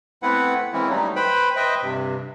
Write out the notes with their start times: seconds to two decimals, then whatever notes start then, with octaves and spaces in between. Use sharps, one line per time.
0.23 A3 B3 C4 E4 B4 F#5
0.73 E3 G#3 A#3 C4 C#4 E4
0.89 F#3 G3 A3 D#4
1.16 B4 C5 G5 B5
1.56 B4 C5 D#5 E5 G5
1.82 G2 C3